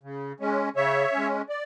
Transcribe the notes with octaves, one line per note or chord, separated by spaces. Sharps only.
C#3
G#3 C#4
C#3 C#5 E5
G#3 C#4
D5